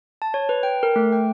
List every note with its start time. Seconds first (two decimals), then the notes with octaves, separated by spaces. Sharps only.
0.22 A5
0.34 C#5
0.49 B4
0.63 G5
0.83 A#4
0.96 A3
1.12 G5